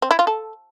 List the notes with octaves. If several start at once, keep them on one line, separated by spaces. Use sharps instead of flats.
C4
E4
F4
A4